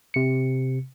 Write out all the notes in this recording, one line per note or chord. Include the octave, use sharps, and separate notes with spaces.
C3 C#7